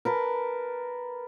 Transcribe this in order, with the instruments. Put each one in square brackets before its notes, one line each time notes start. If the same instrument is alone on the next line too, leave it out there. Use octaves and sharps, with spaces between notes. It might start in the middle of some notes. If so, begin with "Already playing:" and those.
[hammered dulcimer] A#4 B4 A5